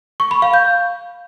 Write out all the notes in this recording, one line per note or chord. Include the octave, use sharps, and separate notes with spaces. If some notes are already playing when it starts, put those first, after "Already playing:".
C#6
B5
F5
G6